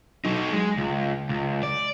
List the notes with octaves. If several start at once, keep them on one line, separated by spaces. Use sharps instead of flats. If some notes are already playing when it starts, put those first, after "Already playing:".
F#3 D#4
G#3
C#2
C#2
D5